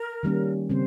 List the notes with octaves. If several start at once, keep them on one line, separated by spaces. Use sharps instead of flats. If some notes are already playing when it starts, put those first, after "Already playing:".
Already playing: A#4
D#3 G3 A#3 C#4 G4
C#3 G3 C4 C5